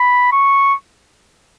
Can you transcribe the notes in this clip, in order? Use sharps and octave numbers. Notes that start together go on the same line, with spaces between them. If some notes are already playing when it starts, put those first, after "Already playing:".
Already playing: B5
C#6